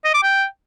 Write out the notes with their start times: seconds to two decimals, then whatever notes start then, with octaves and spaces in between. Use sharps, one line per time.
0.05 D#5
0.14 D6
0.23 G5